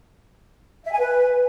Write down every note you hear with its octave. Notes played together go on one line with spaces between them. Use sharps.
E5
G#5
B4